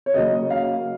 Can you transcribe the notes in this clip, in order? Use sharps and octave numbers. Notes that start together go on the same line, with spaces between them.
C#5
C#3 F#3 A#3 C#4 D#5
F5